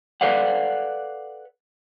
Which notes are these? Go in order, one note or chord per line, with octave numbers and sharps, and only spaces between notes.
A4 B4 D5 F5 F#5